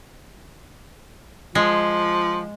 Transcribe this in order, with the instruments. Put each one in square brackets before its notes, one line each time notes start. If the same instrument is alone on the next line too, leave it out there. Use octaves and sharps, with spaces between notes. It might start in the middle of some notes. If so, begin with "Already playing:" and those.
[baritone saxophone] F3 [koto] G#3